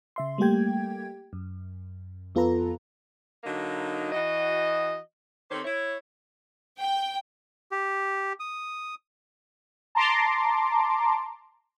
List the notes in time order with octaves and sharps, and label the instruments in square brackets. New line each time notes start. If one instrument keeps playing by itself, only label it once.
[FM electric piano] C#3 E5 C6
G3 A3 A#3 G4 G5 G#6
F#2
F2 B3 F4 A4 B4 A#5
[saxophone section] D3 F#3 A#3 D#4
E3 F#4 D#5
D#3 C4 G4 A4 C5 C#5
E4 C#5
[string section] G5
[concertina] G4
D#6
[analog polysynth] A5 A#5 C6 D6